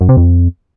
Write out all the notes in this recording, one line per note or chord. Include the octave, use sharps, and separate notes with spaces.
F#2
C3
F2